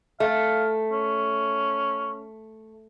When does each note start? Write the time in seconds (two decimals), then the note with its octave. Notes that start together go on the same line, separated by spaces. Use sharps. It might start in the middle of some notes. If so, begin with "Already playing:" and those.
0.20 A3 F5
0.92 C#4